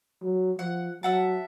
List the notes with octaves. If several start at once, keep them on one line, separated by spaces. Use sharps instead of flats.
F#3
F3 F#5
F#3 E5 F#5 A5